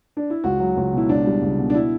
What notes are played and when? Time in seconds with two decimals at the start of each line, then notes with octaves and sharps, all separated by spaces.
0.17 D4
0.30 E4
0.44 C#2 F#4
0.60 F#3
0.76 C#2
0.93 B2 E4
1.09 C#2 D4
1.26 G3
1.42 C#2
1.58 B2
1.70 D4
1.74 E4